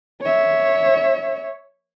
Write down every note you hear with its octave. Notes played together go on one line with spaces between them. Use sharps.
C#5 E5